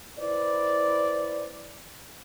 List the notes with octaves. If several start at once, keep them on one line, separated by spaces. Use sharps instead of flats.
E4 B4 C5 D5